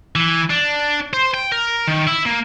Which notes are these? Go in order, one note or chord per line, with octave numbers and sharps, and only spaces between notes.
E3
D4
C5
G5
A#4
D#3
E4
A#3